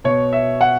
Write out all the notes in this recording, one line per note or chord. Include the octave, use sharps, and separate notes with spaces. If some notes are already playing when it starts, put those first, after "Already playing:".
B2 C#5
E5
F#5